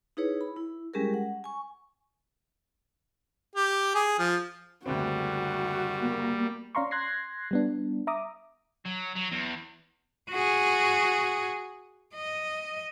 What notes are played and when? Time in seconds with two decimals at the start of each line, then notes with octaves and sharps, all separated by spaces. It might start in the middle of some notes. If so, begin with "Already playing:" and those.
0.17 D#4 E4 G#4 B4 C#5
0.41 B5
0.56 E4
0.94 G3 G#3 C#4 G4 G#4 A#4
1.14 F#5
1.44 G#5 C#6
3.55 G4
3.95 G#4
4.19 F3
4.86 F#1 D2 G3 C4 F#4
6.02 A#3
6.75 C#4 D5 F5 A#5 C6 C#6
6.91 C6 F#6 G#6 A#6 C7
7.51 G3 B3 D4
8.07 E5 A#5 D6 D#6
8.86 F#3
9.16 F#3
9.32 E2
10.30 F#4 G#4
12.15 D#5